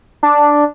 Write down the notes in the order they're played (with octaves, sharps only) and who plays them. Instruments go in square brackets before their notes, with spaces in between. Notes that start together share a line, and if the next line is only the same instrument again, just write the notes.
[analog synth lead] D4